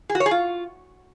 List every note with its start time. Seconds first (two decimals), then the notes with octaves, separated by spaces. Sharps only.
0.10 G#4
0.15 F#4
0.20 C#5
0.26 G#4
0.31 F4